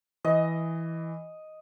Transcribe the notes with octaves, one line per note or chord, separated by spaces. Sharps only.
E3 D#5